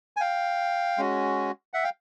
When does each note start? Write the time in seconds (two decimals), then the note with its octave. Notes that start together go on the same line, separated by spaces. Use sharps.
0.17 G#5
0.20 F5 G5
0.97 G#3 C#4 F#4
1.74 E5 F#5
1.84 F5 G5